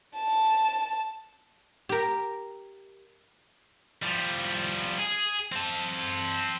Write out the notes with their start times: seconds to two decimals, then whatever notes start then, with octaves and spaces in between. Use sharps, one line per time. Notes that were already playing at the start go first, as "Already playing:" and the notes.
0.18 A5
1.89 G4 A#4
4.03 F3 G3
4.99 G#4
5.52 C4 A5